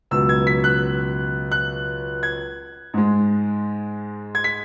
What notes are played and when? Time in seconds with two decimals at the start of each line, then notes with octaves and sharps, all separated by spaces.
0.11 C#2 B2 F#3 E6
0.29 G#6
0.47 B6
0.64 F#6
1.52 F#6
2.23 G#6
2.94 G#2 G#3
4.35 G#6
4.44 B6